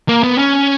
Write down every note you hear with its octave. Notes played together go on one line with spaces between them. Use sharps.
A#3
B3
C#4